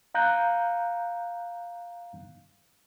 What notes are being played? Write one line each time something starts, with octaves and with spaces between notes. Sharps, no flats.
F5 A#5 F#6 G6